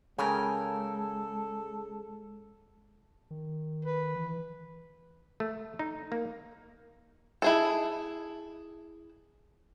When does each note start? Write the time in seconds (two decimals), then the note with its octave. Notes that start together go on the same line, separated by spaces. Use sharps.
0.19 C#3 G#3 A4 A#4 G5 G#5
3.31 D#3
3.85 B4
4.16 E3
5.40 A3
5.79 D#4
6.12 A#3
7.42 E4 G#4 A4